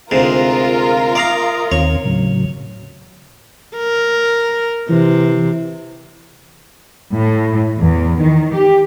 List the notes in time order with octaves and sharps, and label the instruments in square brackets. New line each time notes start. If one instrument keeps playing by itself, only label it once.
[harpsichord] D2 G#2 C3 [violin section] F4 A#4 [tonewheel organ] G#4
[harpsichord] D5 F5 A#5 [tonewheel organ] E5 D#6
[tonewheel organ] D#2 D#3 C4 [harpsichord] C#5
[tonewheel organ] A2 C#3 F#3
[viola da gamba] A#4
[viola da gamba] C3 [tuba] E3
[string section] A2
E2
D#3
G4